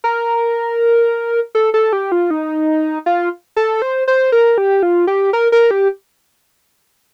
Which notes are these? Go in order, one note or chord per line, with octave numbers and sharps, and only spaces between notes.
A#4
A4
A4
G4
F4
D#4
F4
A4
C5
C5
A#4
G4
F4
G4
A#4
A#4
G4